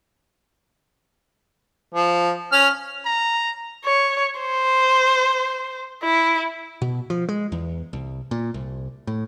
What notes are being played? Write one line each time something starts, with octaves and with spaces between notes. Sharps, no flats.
F3
C#4 F6
A#5
C#5
C5
E4
B2
F3
G#3
E2
C2
A#2
C2
A2